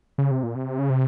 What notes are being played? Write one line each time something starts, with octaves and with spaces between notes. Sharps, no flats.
C#3
C3
A#2
C3
C#3
C3